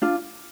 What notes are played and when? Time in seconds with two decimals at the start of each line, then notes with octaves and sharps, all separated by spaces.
0.02 D4 F4